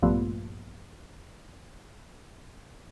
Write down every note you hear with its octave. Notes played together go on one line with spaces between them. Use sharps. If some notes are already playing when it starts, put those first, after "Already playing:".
A#1 G2 F3 A3 B3